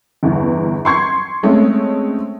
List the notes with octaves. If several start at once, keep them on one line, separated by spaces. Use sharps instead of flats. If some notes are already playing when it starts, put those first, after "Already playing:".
G1 E2
C6 C#6 G#6 C7
G#3 A3 C4 C#4